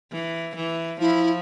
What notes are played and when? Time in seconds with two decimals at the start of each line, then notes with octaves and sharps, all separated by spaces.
0.12 E3
0.56 E3
1.00 F3 E4